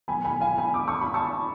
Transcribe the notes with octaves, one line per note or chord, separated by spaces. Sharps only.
B2 F#3 G#5 B5
G#5 B5
F5 G#5
G#5 B5
D6
C#6
B5
A5 C#6